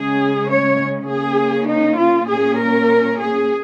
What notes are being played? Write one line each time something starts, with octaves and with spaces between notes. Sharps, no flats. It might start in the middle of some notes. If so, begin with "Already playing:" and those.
Already playing: C#3 G#3 C#4 G#4
C#5
C#3 A#3 C#4 G#4
D#4
F4
A#2 A#3 C#4 G#4
A#4
G#4